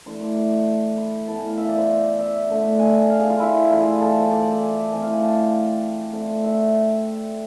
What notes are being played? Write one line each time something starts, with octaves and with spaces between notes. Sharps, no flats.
E3 A3 D4 C6
D6
C6
B5
A2 E3 B3 A5
G#5
F5
E5
D5
C5
E5
D3 A3 D4
G#5
F5
G#4
F4
E4
E3 A3 D4 F4
G#4
A4
C5
D5
D5
E5
G#5
E3 A3 C4 G#5
F5
G#5
A5
D3 A3 C4
E5